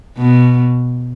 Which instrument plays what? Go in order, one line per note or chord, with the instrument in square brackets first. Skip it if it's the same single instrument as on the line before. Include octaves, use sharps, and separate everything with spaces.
[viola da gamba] B2